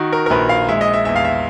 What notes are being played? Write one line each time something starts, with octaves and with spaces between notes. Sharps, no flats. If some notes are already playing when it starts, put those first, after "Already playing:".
Already playing: D#3 F#4
A#4
A#4
A#1 B4
F5
G#3 E5
D#5
E5
E2 E5
F5
E5